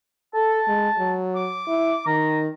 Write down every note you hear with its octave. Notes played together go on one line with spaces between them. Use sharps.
A4 A5
G#3
F#3
D6
E4
D#3 A#5